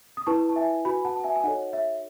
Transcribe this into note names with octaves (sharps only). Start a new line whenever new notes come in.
D#6
E4 B4 A5 C#6
A5
E5 G#5
F#4 B4 G#5 B5
F#5 A5
A5
E5 G#5
G#5
D#4 F#4 A4 C#5 D#5 F#5
E5